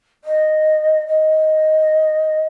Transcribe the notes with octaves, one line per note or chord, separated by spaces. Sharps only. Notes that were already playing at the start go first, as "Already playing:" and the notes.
D#5
D#5